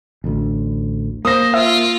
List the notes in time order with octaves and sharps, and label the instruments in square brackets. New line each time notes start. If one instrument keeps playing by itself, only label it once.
[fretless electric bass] A1 D2
[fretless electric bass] A#3 [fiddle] C5 [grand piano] D#6 A#6
[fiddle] F4 [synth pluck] E5